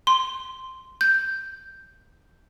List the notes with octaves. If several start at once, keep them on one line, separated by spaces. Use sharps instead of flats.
C6
G6